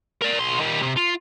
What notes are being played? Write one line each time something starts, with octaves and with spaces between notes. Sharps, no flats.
A#4 D5
B1 C6
D#3 G3
C3
F4